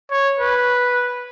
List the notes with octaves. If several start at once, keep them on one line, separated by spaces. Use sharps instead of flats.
C#5
B4